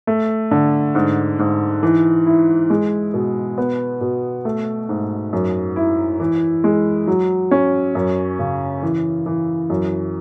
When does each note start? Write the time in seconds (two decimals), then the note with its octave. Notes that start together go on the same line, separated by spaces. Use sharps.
0.07 A3
0.51 D3
0.95 G#2
1.39 G#2
1.83 E3
2.26 E4
2.70 G#3
3.14 B2
3.58 B3
4.01 B2
4.45 A3
4.89 G#2
5.33 F#2
5.76 E4
6.20 E3
6.64 G#3
7.07 F#3
7.51 C#4
7.95 F#2
8.39 C#3
8.83 E3
9.26 E3
9.70 F#2